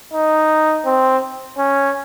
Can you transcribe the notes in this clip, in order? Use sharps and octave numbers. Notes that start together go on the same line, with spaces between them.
D#4
C4
C#4